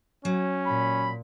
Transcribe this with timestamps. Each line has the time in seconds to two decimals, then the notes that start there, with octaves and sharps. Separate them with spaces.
0.25 F#3 C#4
0.67 A#2 B5